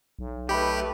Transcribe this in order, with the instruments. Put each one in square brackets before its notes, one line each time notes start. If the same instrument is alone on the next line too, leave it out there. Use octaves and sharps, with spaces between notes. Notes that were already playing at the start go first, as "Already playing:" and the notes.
[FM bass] B1
[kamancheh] A3 B4 [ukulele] D#4 B5 [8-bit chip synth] G4